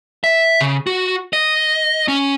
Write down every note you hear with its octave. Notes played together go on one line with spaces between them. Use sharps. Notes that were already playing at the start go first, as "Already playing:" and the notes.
E5
C#3
F#4
D#5
C#4